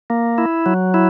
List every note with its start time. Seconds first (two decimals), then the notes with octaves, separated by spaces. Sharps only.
0.10 A#3
0.38 E4
0.66 F#3
0.94 E4